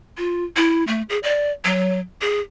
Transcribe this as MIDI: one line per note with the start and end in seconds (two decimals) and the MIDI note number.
0.17 0.44 65
0.56 0.85 64
0.87 1.02 57
1.09 1.19 68
1.23 1.50 74
1.64 1.99 54
2.21 2.40 68